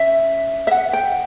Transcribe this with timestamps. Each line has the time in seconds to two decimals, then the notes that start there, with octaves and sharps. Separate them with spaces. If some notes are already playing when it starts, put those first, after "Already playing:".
Already playing: C#4 E5
0.67 E5
0.71 F#5
0.93 G5